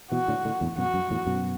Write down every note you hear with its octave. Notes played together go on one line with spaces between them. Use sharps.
B2 E3 F#4
A2 D3
A2 D3
E2 A2
F#2 B2 F#4
F#2
E2 A2
F#2 B2